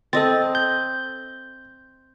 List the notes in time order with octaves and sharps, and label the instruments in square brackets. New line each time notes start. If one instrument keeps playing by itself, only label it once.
[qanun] C4 D#5 [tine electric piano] A4 A6
[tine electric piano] G6